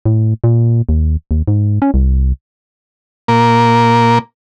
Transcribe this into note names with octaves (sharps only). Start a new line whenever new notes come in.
A2
A#2
D#2
D#2
G#2
C#4
C2
A#2 A#3